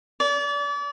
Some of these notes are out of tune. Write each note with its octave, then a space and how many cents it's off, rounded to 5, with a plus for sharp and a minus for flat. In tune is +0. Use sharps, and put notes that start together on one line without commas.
D5 -35